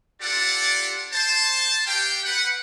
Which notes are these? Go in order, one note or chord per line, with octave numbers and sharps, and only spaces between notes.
D4 F4 G4 A4 D5 F#5
C5 A5
F#4 G4 F5 G5
B4 F#5